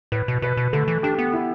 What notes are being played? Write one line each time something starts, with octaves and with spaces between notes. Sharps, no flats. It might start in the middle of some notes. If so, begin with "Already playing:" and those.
A2 B4
B2
B2 B4
B2
D3 A3
E3
D4 G4
B3
E4